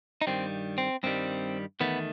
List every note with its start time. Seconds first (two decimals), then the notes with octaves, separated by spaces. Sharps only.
0.21 D#4
0.27 G2 D#3 G3 C4
0.78 C4
1.03 G2 D#3 G3 C4
1.80 E2 D#3 A3 B3